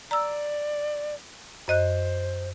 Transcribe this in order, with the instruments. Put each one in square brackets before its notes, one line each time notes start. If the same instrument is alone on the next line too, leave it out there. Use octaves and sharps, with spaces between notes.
[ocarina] D5 [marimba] A#5 E6
[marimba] F#2 D#5 F#6 [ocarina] C5